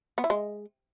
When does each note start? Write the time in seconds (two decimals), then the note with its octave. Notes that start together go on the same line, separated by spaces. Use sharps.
0.18 B3
0.24 E4
0.30 G#3